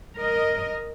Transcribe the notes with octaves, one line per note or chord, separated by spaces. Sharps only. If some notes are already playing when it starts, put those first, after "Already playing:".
A#4 D#5